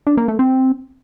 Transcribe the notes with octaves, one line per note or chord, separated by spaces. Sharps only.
D4
A#3
A3
C4